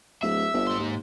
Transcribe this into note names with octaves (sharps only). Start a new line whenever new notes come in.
D1 E5 E6
G1
G#2 C6
D#2